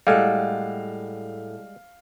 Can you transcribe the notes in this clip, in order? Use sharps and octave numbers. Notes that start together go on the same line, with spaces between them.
A2 G3 G#3 A4 F5 F#5